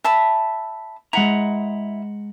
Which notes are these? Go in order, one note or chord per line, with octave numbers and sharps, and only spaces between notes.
E5 A5 B5
G#3 E4 F#5 A#5